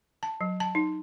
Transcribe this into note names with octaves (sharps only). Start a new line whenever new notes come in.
A5
F#3
A5
D#4